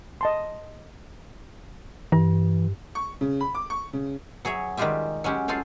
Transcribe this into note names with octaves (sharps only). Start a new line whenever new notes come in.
D#5 A5 C6
G2 E3
C#6
C#3
B5
D6
C#6
C#3
F#3 G#4 C#5 E5
D#3 G3 G#3 F4 G4 E5
F#3 G#3 C#4 G4
F4 G#4 A4 F5 G5